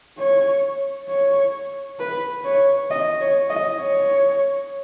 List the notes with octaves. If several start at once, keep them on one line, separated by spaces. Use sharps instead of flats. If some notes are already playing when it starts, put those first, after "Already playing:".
C#5
C#5
B4
C#5
D#5
C#5
D#5
C#5